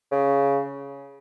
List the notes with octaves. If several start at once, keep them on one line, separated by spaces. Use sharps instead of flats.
C#3